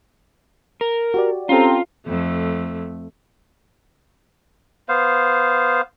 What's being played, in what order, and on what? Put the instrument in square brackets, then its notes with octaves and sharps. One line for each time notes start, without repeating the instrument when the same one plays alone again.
[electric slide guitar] A#4
[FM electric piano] F#4 G4 D5
[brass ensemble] C4 A#5 [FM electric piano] C#4 G4 A4 [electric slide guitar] F4
[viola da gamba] F2 A3
[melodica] B3 C5 F5